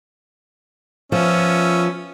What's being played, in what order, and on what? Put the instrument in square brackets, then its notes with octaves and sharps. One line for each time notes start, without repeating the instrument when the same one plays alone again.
[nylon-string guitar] F3 [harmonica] B3 C#4 E5